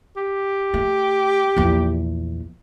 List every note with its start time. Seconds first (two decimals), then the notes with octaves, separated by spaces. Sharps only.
0.16 G4
0.74 A3
1.57 A#1 E2